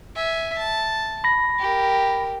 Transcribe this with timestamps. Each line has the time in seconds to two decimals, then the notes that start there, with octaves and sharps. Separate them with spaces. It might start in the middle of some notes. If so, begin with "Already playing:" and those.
0.15 E5 G#5
0.58 A5
1.24 B5 A#6
1.59 G4 A#4